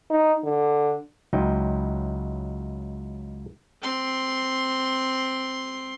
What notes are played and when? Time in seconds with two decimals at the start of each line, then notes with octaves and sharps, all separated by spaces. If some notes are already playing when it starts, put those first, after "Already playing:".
0.10 D#4
0.44 D3
1.33 C#2 F#3 D#4 E4 G5
3.82 C4 C6